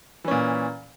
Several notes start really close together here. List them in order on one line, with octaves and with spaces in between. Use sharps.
E3 C#4 A#2